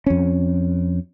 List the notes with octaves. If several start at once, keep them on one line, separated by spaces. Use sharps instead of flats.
F2 C#4